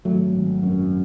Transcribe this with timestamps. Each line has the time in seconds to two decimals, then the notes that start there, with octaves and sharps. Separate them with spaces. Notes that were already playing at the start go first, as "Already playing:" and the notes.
0.05 G#1 F#3 A3
0.35 G#1
0.63 F#2